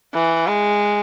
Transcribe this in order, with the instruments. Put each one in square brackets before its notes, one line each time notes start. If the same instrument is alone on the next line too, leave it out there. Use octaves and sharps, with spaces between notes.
[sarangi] E3
G#3